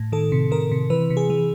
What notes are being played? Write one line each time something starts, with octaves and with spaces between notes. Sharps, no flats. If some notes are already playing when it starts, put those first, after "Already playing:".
Already playing: A2
D#3 A4
C3
D#3 A#4
C3
E3 B4
C3
G#4
E3